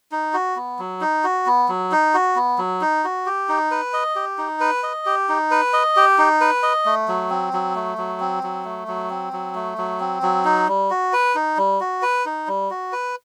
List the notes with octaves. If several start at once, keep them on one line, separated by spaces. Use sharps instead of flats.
D#4
F#4
B3
F#3
D#4
F#4
B3
F#3
D#4
F#4
B3
F#3
D#4
F#4
G4
D#4
B4
D#5
G4
D#4
B4
D#5
G4
D#4
B4
D#5
G4
D#4
B4
D#5
A3
F#3
C4
F#3
A3
F#3
C4
F#3
A3
F#3
C4
F#3
A3
F#3
C4
F#3
D#4
G3
F#4
B4
D#4
G3
F#4
B4
D#4
G3
F#4
B4